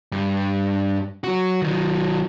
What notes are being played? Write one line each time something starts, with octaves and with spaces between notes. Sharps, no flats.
G2
F#3 F#4
D#3 F#3